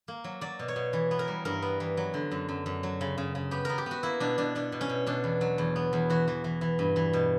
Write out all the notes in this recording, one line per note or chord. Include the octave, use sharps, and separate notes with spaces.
A#3
F#3
F#3 D5
B2
C#5
B2
E3
B3
A#4
G3
G2 A#4
B3
E3
F#3
D3
F#2
F#2
F#2
F#3
C#3
C#3
C#3
B3 G4
B3 A#4
G4
B3 F#4
A#3 E4
B2 D4
B2 D4
B2 D4
B2
C#4
B2
B2 D4
E2
F#3
E2
B3
E2
E3 F#4
E3
E3
E3
G2
E3
B2